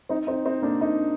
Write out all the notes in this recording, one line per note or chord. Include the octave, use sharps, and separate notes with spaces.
C4 D#4
C4 D#4
C4 D#4
A#3 D4
D#4